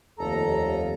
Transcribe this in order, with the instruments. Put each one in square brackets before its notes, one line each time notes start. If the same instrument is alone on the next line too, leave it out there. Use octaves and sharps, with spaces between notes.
[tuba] F1 [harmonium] D#2 A4 A#5